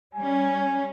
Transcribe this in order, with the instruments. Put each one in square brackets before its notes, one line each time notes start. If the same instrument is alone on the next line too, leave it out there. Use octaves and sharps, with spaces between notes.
[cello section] G3 C#4 [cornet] G#5